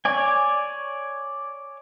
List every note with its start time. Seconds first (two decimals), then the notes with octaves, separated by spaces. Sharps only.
0.05 C#5 D5 G#5